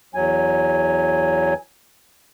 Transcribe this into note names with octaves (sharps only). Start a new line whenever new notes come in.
E2 F#3 G#5